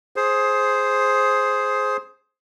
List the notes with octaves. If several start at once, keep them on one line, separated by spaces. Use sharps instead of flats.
G#4 C5